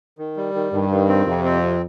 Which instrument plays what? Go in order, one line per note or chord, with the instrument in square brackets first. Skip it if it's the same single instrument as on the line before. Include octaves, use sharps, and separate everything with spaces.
[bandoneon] D#3
G3
D#3
[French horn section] G2 [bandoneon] D#3
[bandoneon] D#3
C4
[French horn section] F2 [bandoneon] C3
[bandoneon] C4
C3